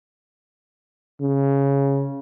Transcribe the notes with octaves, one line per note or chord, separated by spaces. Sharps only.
C#3